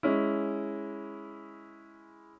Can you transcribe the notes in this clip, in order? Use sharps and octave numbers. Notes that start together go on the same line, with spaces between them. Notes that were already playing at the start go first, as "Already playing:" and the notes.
G#3 C#4 E4